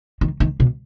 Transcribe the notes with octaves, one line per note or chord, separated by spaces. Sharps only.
D#3
D#3
B2